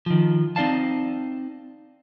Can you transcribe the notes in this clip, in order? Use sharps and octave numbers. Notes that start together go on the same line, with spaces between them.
D#3 F3
C4 D#4 D5 F5 A5